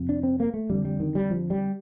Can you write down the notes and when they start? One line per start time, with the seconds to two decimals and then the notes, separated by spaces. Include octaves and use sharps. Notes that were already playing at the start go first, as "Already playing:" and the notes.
Already playing: F2 C3
0.09 D4
0.23 C4
0.40 A#3
0.54 A3
0.70 F2 D3 G3
0.85 G3
1.00 D#3
1.15 G3
1.31 F3
1.50 G3